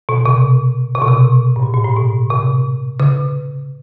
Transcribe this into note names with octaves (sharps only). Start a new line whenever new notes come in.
B2
C3
C3
B2
C3
A2
A#2
A#2
A2
B2
C3
C#3